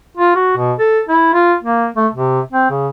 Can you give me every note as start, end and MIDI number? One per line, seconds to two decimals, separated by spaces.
0.17 0.34 65
0.35 0.55 66
0.57 0.73 47
0.79 1.00 69
1.08 1.31 64
1.33 1.55 65
1.63 1.87 58
1.96 2.07 57
2.13 2.40 48
2.52 2.67 60
2.70 2.88 49